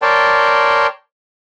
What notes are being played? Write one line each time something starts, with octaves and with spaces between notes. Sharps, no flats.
A#4 C#5 D5 G5 A5 C6